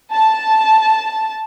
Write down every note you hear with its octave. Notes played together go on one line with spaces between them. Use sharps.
A5